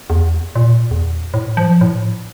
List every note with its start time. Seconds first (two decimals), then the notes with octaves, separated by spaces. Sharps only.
0.10 E2
0.55 A#2
0.91 E2
1.34 A2
1.57 F3
1.81 A2